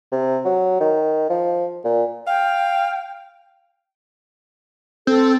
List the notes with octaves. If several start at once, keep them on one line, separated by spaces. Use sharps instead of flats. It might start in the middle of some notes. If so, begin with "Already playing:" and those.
C3
F#3
D#3
F3
A#2
F5 G5
C4 A4